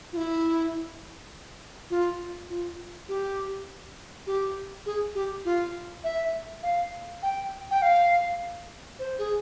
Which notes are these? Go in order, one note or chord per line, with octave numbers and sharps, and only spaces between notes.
F4
E4
F4
F4
G4
G4
G#4
G4
F4
E5
F5
G5
G5
F5
C5
G#4